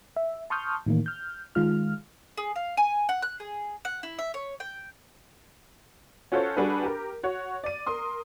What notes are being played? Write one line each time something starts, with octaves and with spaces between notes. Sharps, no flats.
E5
A5 C6 C#6 D#6 F6 G6
A2 D#3 E3 A#3
F6 G6
D#3 G#3 F4 F6
G#4
F5
G#5
F#5
F#6
G#4
F#5
E4
E5
C#5
G5
C#4 F4 F#4 A4 C5 C#5
G3 D4 F#4 G#4 A4 B4
G4 A#4
F#4 C#5
D5 D#7
A#4 C6 D#6